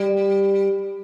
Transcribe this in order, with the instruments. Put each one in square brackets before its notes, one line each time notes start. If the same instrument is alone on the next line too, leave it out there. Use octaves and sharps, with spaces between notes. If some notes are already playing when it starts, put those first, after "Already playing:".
Already playing: [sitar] G3